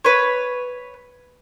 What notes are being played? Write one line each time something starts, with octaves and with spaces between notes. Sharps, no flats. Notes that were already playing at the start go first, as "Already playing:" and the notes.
B4 C#5